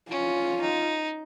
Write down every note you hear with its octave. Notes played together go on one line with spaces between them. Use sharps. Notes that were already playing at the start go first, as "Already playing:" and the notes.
C#4 F4
D#4